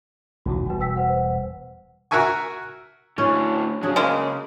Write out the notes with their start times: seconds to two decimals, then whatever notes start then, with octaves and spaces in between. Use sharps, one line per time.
0.46 B1 E2 D#3 F#4
0.66 E1 G3 F#4 B4
0.80 G5 E6 B6
0.96 B4 C5 F#5
2.11 F#4 A#4 E5 G#5 C#6
3.18 A2 D3 C#4
3.83 C#3 F#3 D4 G#4
3.96 G#3 A#3